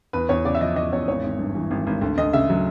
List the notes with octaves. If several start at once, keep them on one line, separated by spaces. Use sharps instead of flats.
E2 B4
E2 C#5
C#3 D5
E5
F3 D#5
E2 D#5
E2 C#5
G#1 C#5
G#1
G2
E3
G#1
G#1
D2
D2 D#5
C#3 E5
F#3